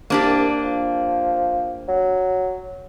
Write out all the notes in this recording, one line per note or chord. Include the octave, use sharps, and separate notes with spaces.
C2 A#3 D4 G4
F3
F#3